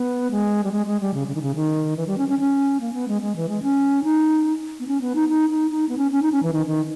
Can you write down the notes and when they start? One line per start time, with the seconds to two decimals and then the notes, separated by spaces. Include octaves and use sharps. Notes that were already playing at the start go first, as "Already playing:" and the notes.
Already playing: B3
0.31 G#3
0.64 G3
0.72 G#3
0.87 G#3
1.01 G3
1.14 C#3
1.28 C#3
1.35 D#3
1.42 C#3
1.55 D#3
1.97 E3
2.07 G3
2.18 C#4
2.29 C#4
2.39 C#4
2.80 A#3
2.93 B3
3.08 G#3
3.22 G#3
3.36 E3
3.49 G#3
3.63 C#4
4.04 D#4
4.80 B3
4.88 C#4
5.01 B3
5.15 D#4
5.29 D#4
5.50 D#4
5.71 D#4
5.89 B3
5.98 C#4
6.12 C#4
6.22 D#4
6.32 C#4
6.43 E3
6.53 D#3
6.67 D#3